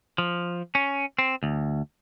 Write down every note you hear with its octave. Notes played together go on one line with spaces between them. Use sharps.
F3
C#4
C4
D2